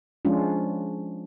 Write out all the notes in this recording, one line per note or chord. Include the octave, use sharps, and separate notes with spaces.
F3 G#3 C#4 D4 F4